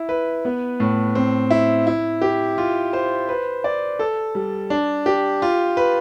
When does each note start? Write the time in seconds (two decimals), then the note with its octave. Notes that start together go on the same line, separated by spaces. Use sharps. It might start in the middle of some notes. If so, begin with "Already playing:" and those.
Already playing: E4
0.09 B4
0.45 B3
0.80 A2
1.15 C4
1.50 E4
1.87 E4
2.22 G4
2.58 F4
2.93 C5
3.29 B4
3.64 D5
3.99 A4
4.35 G3
4.70 D4
5.06 G4
5.42 F4
5.77 B4